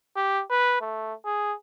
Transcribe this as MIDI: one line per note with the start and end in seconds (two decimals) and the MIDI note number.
0.17 0.42 67
0.50 0.76 71
0.81 1.14 57
1.25 1.53 68